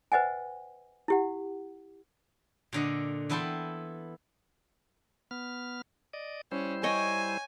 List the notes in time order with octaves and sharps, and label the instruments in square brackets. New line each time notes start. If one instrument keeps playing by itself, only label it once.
[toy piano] B4 C5 D#5 F#5 G#5
E4 G4 F#5
[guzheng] A#2 D3 D#5
E3 B3 E4 A4 G5 C6
[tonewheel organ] B3 F6
D5 D#5
[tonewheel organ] G3 E4 C5 [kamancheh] C#4
[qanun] C#5 D#5 G5 [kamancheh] G#5